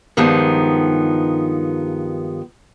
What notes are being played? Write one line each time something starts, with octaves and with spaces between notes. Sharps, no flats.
G2 D#3 F3 G#3 B3